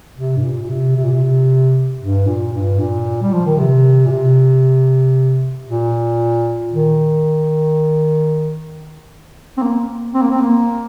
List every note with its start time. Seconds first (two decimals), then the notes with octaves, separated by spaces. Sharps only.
0.17 C3
0.36 G2
0.43 A#2
0.62 A#2
0.69 C3
0.96 C3
1.04 A#2
1.12 C3
2.01 G2
2.27 A#2
2.53 G2
2.79 A#2
3.22 G3
3.33 F3
3.46 D#3
3.58 C3
4.06 A#2
4.11 C3
5.68 A#2
6.73 D#3
9.58 C4
9.62 A#3
10.14 C4
10.22 A#3
10.30 C4
10.41 A#3